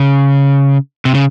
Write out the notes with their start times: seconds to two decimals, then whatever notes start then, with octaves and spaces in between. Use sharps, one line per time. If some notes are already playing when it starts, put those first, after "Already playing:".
Already playing: C#3
1.05 C3
1.15 C#3